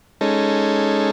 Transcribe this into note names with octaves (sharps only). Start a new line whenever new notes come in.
G#3 C#4 D#4 A4